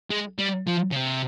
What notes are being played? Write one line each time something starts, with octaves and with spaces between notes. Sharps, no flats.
G#3
G3
F3
C#3
C3